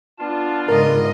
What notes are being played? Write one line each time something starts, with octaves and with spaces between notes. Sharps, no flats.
B3 D4 F4 A5
G#2 C#3 A#4 D#5